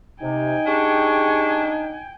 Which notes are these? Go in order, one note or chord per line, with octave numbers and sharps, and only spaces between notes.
C3 D#4 G5 G#5
D4 G4 G#4 C#6